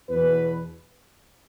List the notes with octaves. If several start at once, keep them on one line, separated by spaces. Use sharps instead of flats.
E2 B2 B4